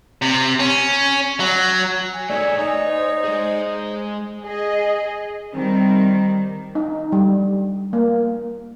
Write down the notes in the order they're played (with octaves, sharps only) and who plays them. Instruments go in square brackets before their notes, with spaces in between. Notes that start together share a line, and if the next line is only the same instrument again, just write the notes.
[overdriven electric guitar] C3
C#4
F#3
[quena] G#5
[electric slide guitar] A3 D#4 G#4 [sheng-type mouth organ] C#5 E5 [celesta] D5
[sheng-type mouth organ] D#4 [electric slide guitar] C#5
[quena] C5
[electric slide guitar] G#3 G#4 [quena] C5
[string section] G#4 D#5
[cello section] D#3 G3 [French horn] C4
[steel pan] D#4
G3
A#3